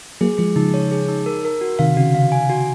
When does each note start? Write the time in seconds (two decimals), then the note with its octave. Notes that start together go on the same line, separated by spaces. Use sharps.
0.21 F#3 A#3 G#4
0.38 F3 G#3 G#4
0.56 C#3 F3 D#4
0.74 C#5
0.91 G#4
1.08 D#4
1.26 A#4
1.45 A#4
1.61 F#4
1.79 C3 D#3 F5
1.97 C#3 F#4
2.15 C#3 F5
2.32 G#5
2.49 F#4